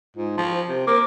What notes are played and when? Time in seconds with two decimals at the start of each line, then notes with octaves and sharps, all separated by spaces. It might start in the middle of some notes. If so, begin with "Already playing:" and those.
0.16 G#2 F4
0.37 F3
0.54 C5
0.69 C3
0.87 A#3 D6